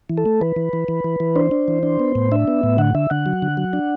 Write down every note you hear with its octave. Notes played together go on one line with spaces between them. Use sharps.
E3
A4
A3
E3 B4
E3
E3
E3
E3
E3
D4 C5
D4
E3
D4
B3
A2
D4 E5
B3
A2
D3 F#5
D3 E5
D3 F#5
F#3
D3
F#3
D4